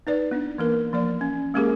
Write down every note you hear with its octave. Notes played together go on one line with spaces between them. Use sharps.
D#4 B4 D5
B3 D4
E3 A#3 A#4
F3 A#3 D5
C#4
G#3 A#3 C#4 G4 G#4 A#4